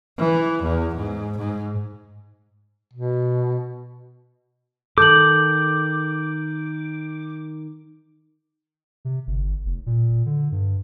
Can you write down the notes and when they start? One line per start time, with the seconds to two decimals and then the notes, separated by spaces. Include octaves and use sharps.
0.18 E3
0.64 E2
0.96 G#2
1.39 G#2
2.93 B2
4.98 D#3 A4 D6 G6 F#7
9.05 C3
9.27 G1
9.65 F1
9.86 A#2
10.26 D3
10.52 G2